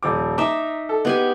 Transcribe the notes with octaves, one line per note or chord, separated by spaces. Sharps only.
D#1 F3 D6
D#4 E5 A#5 D6
A4
G#3 B3 G4 G#5